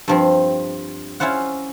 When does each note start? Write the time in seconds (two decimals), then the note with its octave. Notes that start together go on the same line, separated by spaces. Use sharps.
0.08 G2 F3 C4
1.20 C#4 E4 F4 C5 F#5